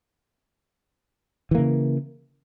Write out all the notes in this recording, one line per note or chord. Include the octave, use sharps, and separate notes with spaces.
C#3 E3 A#3